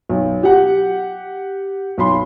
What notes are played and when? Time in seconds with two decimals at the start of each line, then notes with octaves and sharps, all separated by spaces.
0.09 B1
0.43 G4 F#5
1.98 B1 B5 C6